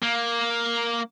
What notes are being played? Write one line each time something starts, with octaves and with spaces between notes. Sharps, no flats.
A#3